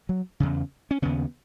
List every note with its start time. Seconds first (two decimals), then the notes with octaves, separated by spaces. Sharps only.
0.09 F#3
0.40 E2 C#3
0.91 C#4
1.02 D#2 C#3 B3